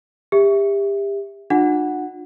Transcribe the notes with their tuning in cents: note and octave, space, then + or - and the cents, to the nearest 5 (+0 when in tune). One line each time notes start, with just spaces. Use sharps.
G4 +30 E5 +0
D4 +35 F4 +40 F#5 +0